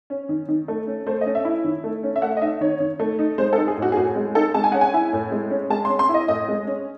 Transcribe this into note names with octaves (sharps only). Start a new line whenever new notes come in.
C#4
D#3
D#3
A3
C#4
A3 C5
D#5
C#4
E5
E4
D#3
A3
C#4
E5
A3 F#5
D#5
D#4 E5
D#3 C#5
D#3
A3
D#4
G#3 C5
A4
D#4
G#4
A2
F#4
G#4
A2 F#4
G#3
D#4 A4
G#3 A5
G#5
C#4 F#5
G#5
E4
A2
G#3
C#4
G#3 A5
C6
C#4
C6
E4
D#5
A2 D#5
G#3
C#4